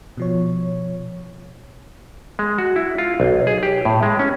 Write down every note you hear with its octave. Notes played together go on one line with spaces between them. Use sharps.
B2 F3 C#5
G#3
F#4
E4
F4
B1
G#4
G4
A2
G#3
C#4